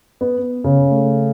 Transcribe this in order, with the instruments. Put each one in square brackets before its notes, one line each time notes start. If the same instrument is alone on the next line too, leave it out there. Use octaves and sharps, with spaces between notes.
[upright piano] B3
[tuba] B3
[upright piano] C#3
[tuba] A3